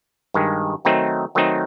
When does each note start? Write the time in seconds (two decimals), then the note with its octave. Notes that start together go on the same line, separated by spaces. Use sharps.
0.34 G2 D#3 G#3
0.85 D#3 F#3 A3 C4 D#4
1.35 D#3 F#3 A3 C4 D#4